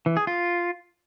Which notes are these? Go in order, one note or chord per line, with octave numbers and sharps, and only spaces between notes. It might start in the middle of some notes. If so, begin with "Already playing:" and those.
E3
G#4
F4